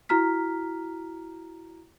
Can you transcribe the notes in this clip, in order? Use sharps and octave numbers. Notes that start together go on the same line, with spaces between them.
E4 F#4 A#5 F6 B6